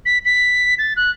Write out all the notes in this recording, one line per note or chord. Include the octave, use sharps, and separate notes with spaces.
B6
B6
A6
F#6